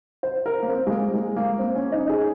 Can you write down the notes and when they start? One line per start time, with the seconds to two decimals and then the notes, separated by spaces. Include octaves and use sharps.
0.23 C5
0.46 A#4
0.62 A#3
0.68 C4
0.87 G#3
0.90 A#3
1.13 G#3
1.36 A#3
1.59 C4
1.75 C#4
1.92 D#4
2.09 G#4